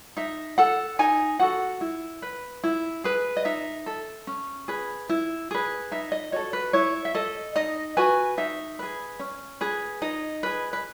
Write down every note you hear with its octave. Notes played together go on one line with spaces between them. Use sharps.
D#4 E5
A4 F#5
D#4 G#5
F#4 A4 F#5
E4
B4
E4
G#4 B4
D#5
D#4 E5
A4
C#4
G#4 B4
E4
G#4 B4
D#4 E5
D#5
F#4 A4 C#5
B4
E4 C#5
E5
A4 D#5
D#4 D#5
F#4 B4 G#5
D#4 E5
G#4 B4
C#4
G#4 B4
D#4 D#5
G#4 B4
B4